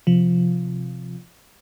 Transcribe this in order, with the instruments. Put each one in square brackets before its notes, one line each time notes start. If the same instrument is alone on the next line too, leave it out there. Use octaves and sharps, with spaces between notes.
[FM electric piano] C3 F3